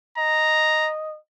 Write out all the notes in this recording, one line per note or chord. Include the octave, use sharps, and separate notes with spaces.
D#5 A#5